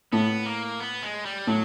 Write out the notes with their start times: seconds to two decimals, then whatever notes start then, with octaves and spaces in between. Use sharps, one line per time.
0.12 A2 B3
0.46 A#3
0.80 B3
1.03 G#3
1.25 G3
1.47 A2 F#3